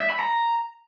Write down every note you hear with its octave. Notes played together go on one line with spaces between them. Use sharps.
E5
B5
A#5